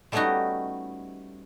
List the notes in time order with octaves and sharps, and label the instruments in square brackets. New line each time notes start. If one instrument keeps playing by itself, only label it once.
[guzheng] G3 A3 B3 C#4 D#4 F#4